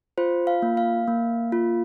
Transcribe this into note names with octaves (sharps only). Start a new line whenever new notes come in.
F4 C5
F5
A#3
F5
A#3
F4